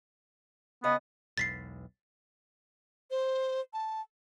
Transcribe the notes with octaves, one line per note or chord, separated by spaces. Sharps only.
C#3 B3 D#5
E1 B1 A6 B6 C7
C5
A5